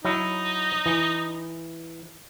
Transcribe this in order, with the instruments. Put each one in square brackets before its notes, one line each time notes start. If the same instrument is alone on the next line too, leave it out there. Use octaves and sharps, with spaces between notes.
[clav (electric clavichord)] F#3 E4 [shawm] D#4
[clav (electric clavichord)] E3